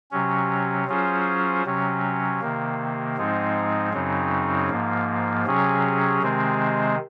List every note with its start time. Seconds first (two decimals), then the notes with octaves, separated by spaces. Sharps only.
0.11 C3 F#3 C#4
0.88 F#3 C#4 F4 G#4 C5
1.65 C3 F#3 C#4
2.41 C3 D#3 A#3
3.17 G#2 F3 G#3 C4 D#4
3.93 F#2 C#3 F#3 C4 D#4
4.70 G#2 F3 A#3
5.46 C3 F#3 C#4 G#4
6.22 C3 D#3 G#3 C4